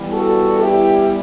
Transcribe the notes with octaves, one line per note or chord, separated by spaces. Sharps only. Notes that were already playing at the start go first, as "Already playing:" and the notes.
Already playing: E3 G3 B3
F#4 A4
E4 G4